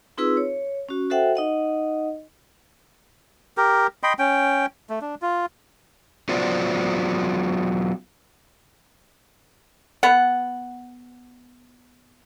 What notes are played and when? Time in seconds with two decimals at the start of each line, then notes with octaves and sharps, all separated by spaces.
0.18 C4 D#4 F4 G#4 B4 E6
0.37 C#5
0.89 C#4 F#4
1.10 F#4 A4 C5 E5 F#5 G5
1.35 D#4 D#5 F#5
3.57 G4 A#4
4.03 D#5 G5 B5 C6
4.19 C#4 G5
4.90 A3
5.02 D4
5.22 F4
6.29 F#3 B3 F4 C5 D5
10.03 B3 F#5